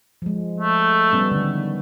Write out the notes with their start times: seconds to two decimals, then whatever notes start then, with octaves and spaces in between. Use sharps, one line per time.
0.22 F3 G#3
0.60 A3
1.12 G3 B3 C#4
1.32 D3 D#3